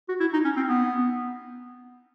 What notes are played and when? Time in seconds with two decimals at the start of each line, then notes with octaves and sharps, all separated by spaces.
0.09 F#4
0.21 E4
0.34 D#4
0.45 C#4
0.56 C4
0.69 B3